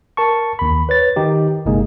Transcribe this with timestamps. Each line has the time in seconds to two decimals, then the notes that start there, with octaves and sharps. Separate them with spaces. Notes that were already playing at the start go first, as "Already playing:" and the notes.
0.17 A#4 A5 C#6
0.59 D#2 B5
0.89 B4 C#5 A6
1.16 D#3 D#4 G4
1.66 G1 C3 G#3 A#3 D#4 G#4